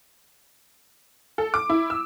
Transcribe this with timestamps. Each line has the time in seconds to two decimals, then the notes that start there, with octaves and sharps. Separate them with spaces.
1.38 A4
1.54 D6
1.70 E4
1.90 E6